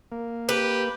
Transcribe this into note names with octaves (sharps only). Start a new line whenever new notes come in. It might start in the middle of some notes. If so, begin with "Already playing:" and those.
A#3
G4 B4